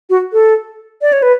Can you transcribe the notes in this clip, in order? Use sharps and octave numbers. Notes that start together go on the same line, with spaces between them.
F#4
A4
D5
C#5
B4